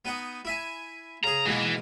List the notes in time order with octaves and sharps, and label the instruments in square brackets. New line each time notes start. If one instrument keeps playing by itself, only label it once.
[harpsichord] B3 D#4 F#5
E4 E5 G#5
[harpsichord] C#3 G#4 [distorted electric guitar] A#5
[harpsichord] G#2 B2 A#3 [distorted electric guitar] E3